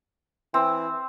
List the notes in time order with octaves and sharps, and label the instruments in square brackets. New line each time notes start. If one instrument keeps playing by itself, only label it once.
[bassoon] E3 [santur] C4